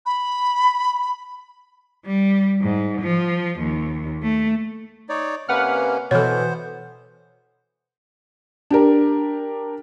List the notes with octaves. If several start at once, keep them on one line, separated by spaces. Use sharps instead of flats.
B5
G3
G#2
F3
D#2
A3
D#4 C#5 D5
C3 A#3 C#4 B4 F#5 F6
B2 E3 B3 A4 C5 C#5
D4 G4 A#4